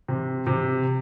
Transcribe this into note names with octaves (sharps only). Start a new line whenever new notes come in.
C3
C3